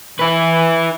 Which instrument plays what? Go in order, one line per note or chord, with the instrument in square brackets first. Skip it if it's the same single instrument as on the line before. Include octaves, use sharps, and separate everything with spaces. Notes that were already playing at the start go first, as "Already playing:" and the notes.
[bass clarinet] E3 [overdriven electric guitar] E4 B4